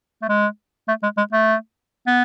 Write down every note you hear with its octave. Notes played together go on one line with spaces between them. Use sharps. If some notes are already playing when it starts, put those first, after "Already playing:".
A3
G#3
A3
G#3
G#3
A3
B3